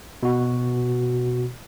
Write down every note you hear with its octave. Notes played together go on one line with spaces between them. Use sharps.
B2 F#4